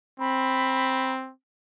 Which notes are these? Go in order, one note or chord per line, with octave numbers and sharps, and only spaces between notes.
C4 B5